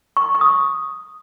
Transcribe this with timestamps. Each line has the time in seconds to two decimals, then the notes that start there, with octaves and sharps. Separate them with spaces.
0.17 C#6
0.35 C#6
0.41 D#6